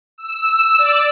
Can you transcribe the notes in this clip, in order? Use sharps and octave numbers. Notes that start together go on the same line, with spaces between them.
E6
D5